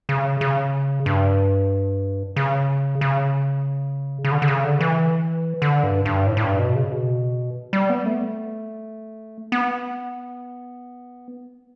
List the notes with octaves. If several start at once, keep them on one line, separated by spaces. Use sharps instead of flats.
C#3
C#3
G2
C#3
C#3
C#3
D3
D3
C#3
D3
E3
D3
G2
G2
A2
A2
G2
B2
C#3
B2
G3
B3
A3
B3